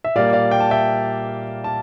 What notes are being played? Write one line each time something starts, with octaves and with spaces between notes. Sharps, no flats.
E5
A#2 G3 A#3 D5 F5
D5 F5
G5
A5
E5 G5
A5